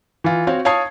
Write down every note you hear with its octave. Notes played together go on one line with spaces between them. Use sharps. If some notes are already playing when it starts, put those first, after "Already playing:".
E3 F4
C4 F#4 C#5 F5
C#5 F5 A5 D#6 G#6 C7